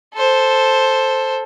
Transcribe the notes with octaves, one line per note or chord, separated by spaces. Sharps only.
A4 C5